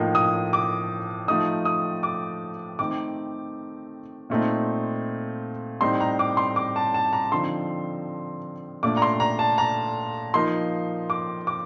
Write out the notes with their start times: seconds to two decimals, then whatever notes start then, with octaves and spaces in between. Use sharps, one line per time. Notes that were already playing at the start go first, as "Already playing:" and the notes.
Already playing: A2 F3 A#3 D#4
0.15 D#6
0.53 D6
1.28 F3 A3 D#4 D#6
1.65 D#6
2.03 D6
2.79 D#3 A3 C4 D#4 D6
4.30 A#2 A3 C4 D#4
5.81 A2 G3 C4 D#4 C6
6.00 A#5
6.19 D6
6.37 C6
6.56 D6
6.76 A5
6.94 A5
7.13 A#5
7.31 D3 F3 C4 D#4 C6
8.83 A#2 A3 D4 D6
8.97 A#5
9.02 C6
9.20 A#5
9.39 A5
9.58 A#5
10.34 F3 A#3 D#4 C6
11.10 D6
11.47 D6